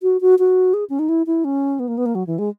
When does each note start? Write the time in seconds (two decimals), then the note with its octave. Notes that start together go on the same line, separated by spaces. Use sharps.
0.02 F#4
0.21 F#4
0.39 F#4
0.74 G#4
0.90 C#4
0.99 D#4
1.09 E4
1.27 E4
1.45 C#4
1.80 B3
1.88 A#3
1.98 B3
2.06 A#3
2.15 F#3
2.27 E3
2.39 G#3